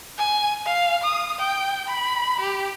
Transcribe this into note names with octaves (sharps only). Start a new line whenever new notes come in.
G#5
F5
D#6
G5
B5
G4